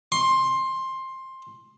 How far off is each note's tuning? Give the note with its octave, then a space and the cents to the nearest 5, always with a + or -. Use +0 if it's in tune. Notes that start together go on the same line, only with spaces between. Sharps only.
C6 +15